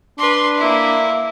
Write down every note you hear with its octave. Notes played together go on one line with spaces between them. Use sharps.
D4 B4 C6
A#3 E4